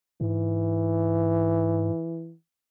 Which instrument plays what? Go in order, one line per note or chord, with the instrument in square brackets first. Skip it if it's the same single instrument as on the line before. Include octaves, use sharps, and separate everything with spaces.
[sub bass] G#2 [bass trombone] E3